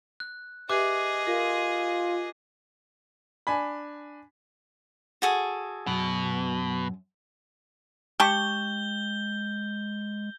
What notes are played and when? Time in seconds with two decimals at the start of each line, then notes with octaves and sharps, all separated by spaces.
0.20 F#6
0.69 G4 G#4 B4 D#5 E5 D6 F#6
1.27 F4 A#4
3.47 D4 G#5 B5
5.22 F#4 G#4 A4
5.87 F#2 B2
8.20 G#3 G4 A5 C#6 G6 G7